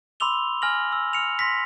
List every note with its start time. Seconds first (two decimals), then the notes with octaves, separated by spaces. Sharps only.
0.20 B5 C6 D6 E6 F7 G7
0.62 G#5 F6 A#6 F#7
0.92 E6
1.13 F6 C#7 F7
1.39 C6 A#6 B6